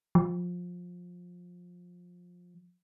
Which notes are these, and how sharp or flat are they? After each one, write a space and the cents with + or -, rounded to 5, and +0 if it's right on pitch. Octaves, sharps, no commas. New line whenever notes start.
F3 +20